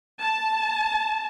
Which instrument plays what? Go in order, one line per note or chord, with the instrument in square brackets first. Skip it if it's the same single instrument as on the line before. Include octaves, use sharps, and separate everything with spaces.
[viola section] A5